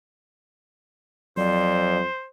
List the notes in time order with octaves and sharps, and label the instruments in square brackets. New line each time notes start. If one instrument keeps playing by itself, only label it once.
[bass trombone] F2 [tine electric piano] F#3 [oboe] C5 [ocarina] D5